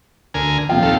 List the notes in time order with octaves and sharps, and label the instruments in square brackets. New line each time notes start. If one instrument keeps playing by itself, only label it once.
[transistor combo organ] D2 A#4 G#5
[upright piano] D#1 C3 G5 [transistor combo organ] F3
[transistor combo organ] D#2 F4 A4